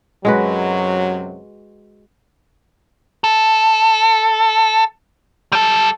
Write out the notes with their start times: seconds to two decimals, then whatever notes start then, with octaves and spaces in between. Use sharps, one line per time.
0.25 F#2 C3 F#3 G#3 F#4 B4
3.24 A4
5.52 G3 A4